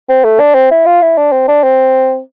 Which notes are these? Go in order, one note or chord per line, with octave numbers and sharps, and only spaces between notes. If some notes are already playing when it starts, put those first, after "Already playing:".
C4
A3
D4
C4
E4
F4
E4
D4
C4
D4
C4